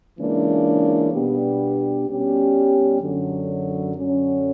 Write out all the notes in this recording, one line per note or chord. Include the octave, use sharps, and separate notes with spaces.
C#2 C#3 E3 A#3 D4
B2 G3 B3 D4 G4
B2 G3 C#4 G4
F#2 D3 F#3
F#2 D3 F#3 C#4